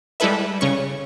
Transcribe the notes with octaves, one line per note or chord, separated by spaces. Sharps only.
G3 G#3 E4 A4 B4 E5
C#3 C#4 C#6